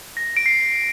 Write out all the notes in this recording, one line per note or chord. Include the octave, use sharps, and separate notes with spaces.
A#6
D7
C7